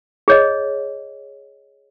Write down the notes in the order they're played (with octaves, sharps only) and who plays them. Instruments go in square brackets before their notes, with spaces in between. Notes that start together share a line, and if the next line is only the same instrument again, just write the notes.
[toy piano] G#4 C#5 D#5